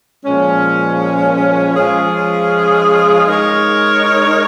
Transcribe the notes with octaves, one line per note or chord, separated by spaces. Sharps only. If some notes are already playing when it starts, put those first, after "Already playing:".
A#2 F3 G#3 C#4
F3 G#3 C#4 F4 G#4
G#3 D#4 A#4 C#5